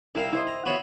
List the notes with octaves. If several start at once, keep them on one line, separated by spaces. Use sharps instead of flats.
C2 C4 E4 A#4 F5
E4 C5 D#5
A#5
B3 F4 F#4 C#5 E5